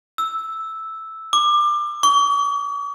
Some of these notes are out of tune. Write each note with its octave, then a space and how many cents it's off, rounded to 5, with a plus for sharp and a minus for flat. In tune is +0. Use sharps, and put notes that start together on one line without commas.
E6 -5
D6 +25
C#6 +45